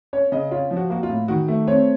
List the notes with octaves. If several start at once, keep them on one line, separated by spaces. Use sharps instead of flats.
C#4 C#5
C#3 D#5
C#4 F4
F3
F#4
A#3 F#4
F4
A2
D#3 F#4
A3
C4 C#5